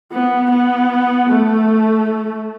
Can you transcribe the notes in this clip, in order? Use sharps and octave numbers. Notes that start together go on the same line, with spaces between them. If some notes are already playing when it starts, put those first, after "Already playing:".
B3
B3
A3